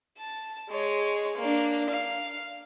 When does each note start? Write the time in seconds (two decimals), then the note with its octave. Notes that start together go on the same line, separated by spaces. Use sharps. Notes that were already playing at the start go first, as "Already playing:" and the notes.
0.18 A5
0.70 G#3 C#5
1.38 A#3 D4
1.90 F5